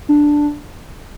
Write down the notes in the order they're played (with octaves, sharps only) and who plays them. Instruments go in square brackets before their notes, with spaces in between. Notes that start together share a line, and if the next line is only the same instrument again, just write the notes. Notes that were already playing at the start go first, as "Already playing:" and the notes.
[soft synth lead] D4